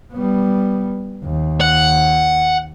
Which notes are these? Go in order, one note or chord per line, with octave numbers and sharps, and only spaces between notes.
G3 B3
D#2
F#5